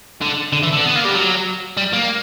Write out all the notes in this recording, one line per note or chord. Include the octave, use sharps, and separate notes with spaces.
D3
D3
E3
D3
B3
A#3
G3
F#3
G3
A#3